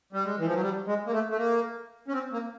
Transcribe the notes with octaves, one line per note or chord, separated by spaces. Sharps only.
G3
G#3
E3
F3
F#3
G3
G#3
A#3
A3
A3
A#3
C#4
C4
A#3